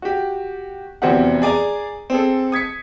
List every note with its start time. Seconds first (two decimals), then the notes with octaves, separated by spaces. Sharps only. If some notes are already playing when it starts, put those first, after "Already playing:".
0.02 F#4 G4
1.02 F1 E2 C4 F#4 G4 F#5
1.42 G#4 D5 G#5 A#5
2.10 C4 G#4 A4
2.52 D#6 G#6 B6 C#7